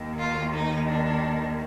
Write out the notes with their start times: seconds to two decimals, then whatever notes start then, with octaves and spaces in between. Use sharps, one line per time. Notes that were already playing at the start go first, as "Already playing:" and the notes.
Already playing: D#2 D#3
0.18 F4
0.54 D#4
0.89 D4